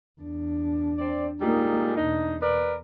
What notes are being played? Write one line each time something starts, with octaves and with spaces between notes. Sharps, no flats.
E2 D4
C4 D5
A#2 G3 G#3 A#3 D#4
E2 B2 D4 D#4
A#4 B4 D5